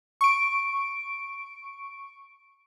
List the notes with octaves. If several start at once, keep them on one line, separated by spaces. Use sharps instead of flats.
C#6 D7